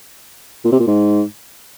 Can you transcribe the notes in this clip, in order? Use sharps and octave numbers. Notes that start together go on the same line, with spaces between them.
A#2
C3
A#2
G#2